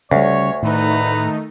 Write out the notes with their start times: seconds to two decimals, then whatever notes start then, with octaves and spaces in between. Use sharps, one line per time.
0.11 D2 C#3 G3 C#5
0.63 A2 D#3 A3 D#4 B4 A#5